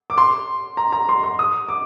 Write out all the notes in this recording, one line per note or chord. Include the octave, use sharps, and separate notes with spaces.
D6
C6
A#5
A#5
C6
C6
D#6
D6